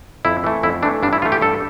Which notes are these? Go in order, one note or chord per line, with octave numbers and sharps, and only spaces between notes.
F2 E4
E3 A3
F2 E4
E3 A3 D4
G2 D4
E4
E3 A3 F4
G4
G2 A4